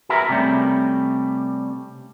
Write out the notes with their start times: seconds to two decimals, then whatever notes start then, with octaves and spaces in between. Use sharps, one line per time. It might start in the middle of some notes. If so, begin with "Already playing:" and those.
0.09 F#4 G#4 A#4 B4 E5
0.29 C3 G3 A3 C#4